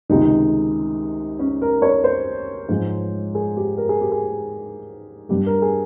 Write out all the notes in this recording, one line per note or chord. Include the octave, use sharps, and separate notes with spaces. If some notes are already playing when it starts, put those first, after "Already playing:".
C#2 C3 D#3 G#3 D#4
C#4
A#4
C#5
C5
G#2 F3 G#3
G#4
G4
A#4
G#4
G4
G#4
G2 G3 G4
A#4
G#4